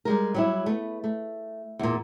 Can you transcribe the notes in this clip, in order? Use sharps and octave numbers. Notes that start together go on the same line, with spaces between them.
G3 G#3 A#4
F#3 G3 E4
A3 B3
A3
E2 A#2